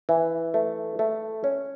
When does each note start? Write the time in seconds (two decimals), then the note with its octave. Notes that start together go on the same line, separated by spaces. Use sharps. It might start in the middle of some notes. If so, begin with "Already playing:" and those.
0.09 E3
0.54 A3
0.99 A3
1.44 C#4